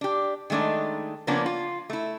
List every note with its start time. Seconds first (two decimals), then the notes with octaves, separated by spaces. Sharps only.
0.01 D4 G4
0.50 D#3 G#3 A3 D4 D#4
1.27 C#3 F3 A#3 B3 C#4 D4
1.46 F4
1.90 A3 E4